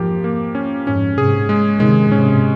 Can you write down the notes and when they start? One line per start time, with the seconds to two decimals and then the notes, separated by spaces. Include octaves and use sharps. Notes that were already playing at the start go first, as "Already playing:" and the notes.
Already playing: F2 G#2 F3 A#3 G4
0.24 A#3
0.55 C#4
0.87 F2 G#2 C#4
1.17 G#2 C3 G#4
1.49 G#3
1.79 C3 D#3 G#3
2.12 G#2 C3 C#4